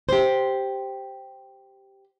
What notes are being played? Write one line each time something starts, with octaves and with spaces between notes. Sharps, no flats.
G4 C5